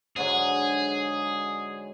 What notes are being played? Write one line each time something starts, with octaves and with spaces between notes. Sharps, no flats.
G#2 D3 F#3 G#4